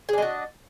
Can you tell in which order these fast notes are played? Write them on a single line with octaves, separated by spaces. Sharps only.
G#4 D4 D#5 F#4